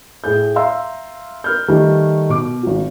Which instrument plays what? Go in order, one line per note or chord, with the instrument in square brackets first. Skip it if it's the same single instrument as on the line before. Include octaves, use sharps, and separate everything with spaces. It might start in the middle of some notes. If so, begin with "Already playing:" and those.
[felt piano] A2 G#4 G6
E5 F5 A#5 C6 E6
A#4 F6 G6
D#3 G3 A3
B2 D6
G#1 F#4